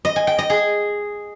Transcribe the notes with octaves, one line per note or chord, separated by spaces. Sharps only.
D#5
G#5
G5
D#5
G#4